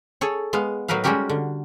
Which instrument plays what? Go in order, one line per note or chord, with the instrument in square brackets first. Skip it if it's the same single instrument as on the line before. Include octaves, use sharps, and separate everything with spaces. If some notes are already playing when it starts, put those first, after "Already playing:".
[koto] G#4 A4 C#5
G#3 B3 F5
A2 F#3 D#4 A#4 B4 F5
G3 G#3 C#4 F#4 G4 A#4
D3